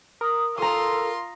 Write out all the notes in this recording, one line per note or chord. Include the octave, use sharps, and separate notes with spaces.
A#4 D#6
F4 A4 A#5 C6 D#6